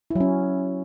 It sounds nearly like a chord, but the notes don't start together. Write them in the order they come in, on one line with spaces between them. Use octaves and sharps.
E4 F#3 C#4